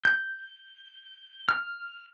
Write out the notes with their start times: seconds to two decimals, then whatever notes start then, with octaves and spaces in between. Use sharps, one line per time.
0.05 G6
1.49 F6